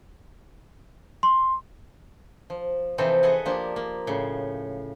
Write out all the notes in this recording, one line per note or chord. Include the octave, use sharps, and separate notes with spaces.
C6
F3
C3 E3 F3 C4 D#4 A4
G#4 A4 B4 D#5 F#5 G#5
F3 A#3 D4 F4 G4
A#3
A2 C#3